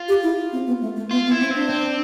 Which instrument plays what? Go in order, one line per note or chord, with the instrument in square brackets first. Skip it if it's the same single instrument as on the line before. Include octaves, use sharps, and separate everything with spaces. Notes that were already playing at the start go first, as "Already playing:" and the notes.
Already playing: [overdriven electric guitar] F4
[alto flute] G4
E4
C4
B3
A3
A3
[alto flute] B3 [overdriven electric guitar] F4
[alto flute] B3
[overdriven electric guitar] E4
[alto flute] C4
[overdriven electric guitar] C4 [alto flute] D4
[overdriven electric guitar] C4